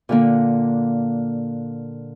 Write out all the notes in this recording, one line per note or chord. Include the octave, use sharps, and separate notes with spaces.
A#2 D3 A#3